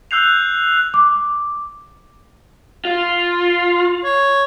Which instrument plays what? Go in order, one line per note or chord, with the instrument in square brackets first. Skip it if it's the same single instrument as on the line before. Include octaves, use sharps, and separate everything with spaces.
[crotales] E6 F#6 G6 C7 F7
[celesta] D6
[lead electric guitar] F4
[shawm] C#5